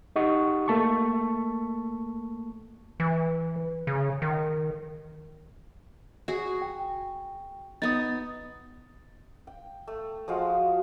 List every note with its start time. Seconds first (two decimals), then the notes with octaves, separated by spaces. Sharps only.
0.16 D#4 G4 D#5 F#5 C#6
0.68 A3 A#3 A5 C#6
3.00 E3
3.87 C#3
4.22 D#3
6.28 F#4 G#4
6.62 G5
7.82 B3 D#4 D#6 A6
9.47 G5
9.87 A3
10.28 F3 G#3 F#4 F5